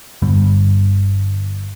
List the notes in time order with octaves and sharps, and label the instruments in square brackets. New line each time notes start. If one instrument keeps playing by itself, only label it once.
[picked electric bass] G1 G2 D3 G3